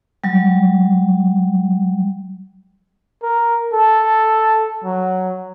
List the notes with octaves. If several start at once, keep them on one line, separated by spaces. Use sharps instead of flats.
F#3 G3
A#4
A4
F#3